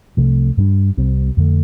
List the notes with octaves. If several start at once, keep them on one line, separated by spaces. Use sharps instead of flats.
C2 C3 F3 A3
G2 G3 D4
C2 C3 G3 C4
F2 D3 A3